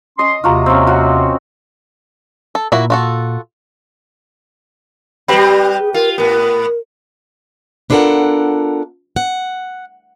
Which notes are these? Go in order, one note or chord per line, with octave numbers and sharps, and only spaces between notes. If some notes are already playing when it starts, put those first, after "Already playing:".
C#4 D#5 C6
D#2 C3 F4 F#4 A#5
C4 C#4
F#4 F#5
A4
A#2 A#3 E4 F#4
F4 F#4 A4
G3 C4 G4 B4
G#4
F4 A#4
A2 B3 A#4
B3 D4 F4 A4 A#4 F#5
F#5